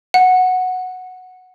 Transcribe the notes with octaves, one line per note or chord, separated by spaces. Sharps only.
F#5